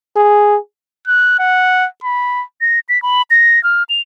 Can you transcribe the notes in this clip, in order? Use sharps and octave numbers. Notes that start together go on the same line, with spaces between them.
G#4
F#6
F#5
B5
A#6
B6
B5
A#6
F6
F7